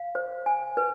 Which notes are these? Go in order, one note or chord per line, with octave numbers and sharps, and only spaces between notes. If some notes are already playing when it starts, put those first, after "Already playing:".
Already playing: F5
C5
G#5
B4